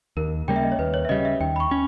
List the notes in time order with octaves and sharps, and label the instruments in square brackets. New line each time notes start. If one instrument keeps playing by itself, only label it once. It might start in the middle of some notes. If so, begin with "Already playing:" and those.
[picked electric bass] D#2 [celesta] A#4
[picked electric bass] C#3 G3 A#3 [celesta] G5
[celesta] E5
D#5
C#5
[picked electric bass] D#2 [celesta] B4
[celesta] C#5
E5
[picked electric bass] C#3 G3 [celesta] D#5
[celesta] E5
[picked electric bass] D#2 [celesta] G5
[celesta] B5
C#6
[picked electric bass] C#4